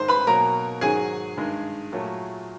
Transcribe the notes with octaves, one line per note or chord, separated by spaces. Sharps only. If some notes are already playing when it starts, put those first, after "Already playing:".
Already playing: G#2 D#3 G#3 C5 C6
B4 B5
B2 F#3 A#3 A#4 A#5
G#2 D#3 F#3 G#4 G#5
G2 D#3 G#3
A#2 F#3 A3